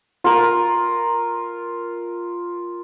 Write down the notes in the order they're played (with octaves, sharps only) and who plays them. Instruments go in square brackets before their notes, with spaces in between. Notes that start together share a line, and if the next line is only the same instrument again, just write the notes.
[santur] F4 A#4